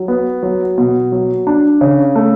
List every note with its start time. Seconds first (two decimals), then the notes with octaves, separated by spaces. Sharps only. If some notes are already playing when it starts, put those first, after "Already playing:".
Already playing: F#3
0.08 B3
0.43 F#3
0.78 B2
1.12 F#3
1.47 D4
1.81 C#3
2.16 A3